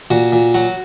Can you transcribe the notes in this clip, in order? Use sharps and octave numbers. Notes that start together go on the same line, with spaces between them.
A#2 F#4
A#2
F#3 F#4